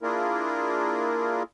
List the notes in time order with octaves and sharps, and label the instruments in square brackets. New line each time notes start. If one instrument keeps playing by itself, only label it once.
[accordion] A#3 D4 E4 F4 G#4 A#4